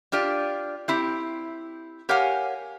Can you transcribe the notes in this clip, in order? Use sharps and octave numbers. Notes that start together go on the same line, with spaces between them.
D4 F4 G4 D5
C4 E4 G4
G4 A#4 C#5 F5 F#5 G#5